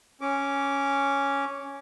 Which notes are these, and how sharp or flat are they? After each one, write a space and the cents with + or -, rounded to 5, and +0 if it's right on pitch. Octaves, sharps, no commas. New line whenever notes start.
C#4 +0 D6 -20